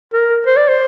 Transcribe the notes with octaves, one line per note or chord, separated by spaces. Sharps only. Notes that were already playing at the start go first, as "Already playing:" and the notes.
A#4
C5
D5
C5